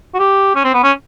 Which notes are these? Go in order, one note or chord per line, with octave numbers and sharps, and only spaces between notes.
F#4
G4
C#4
C4
B3
C#4